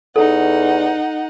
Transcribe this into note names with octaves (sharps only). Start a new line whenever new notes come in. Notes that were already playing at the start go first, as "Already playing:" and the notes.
E2 D#4 A4 F#5